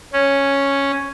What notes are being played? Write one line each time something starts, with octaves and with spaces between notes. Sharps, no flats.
C#4